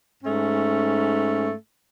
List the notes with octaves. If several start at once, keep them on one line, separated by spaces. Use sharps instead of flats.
G#2 A3 C#4